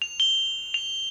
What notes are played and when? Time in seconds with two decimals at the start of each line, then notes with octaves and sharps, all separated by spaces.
0.02 F7
0.20 G7
0.74 F7